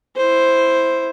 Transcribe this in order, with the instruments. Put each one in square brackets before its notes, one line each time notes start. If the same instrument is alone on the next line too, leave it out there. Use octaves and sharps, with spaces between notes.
[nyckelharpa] E4 C5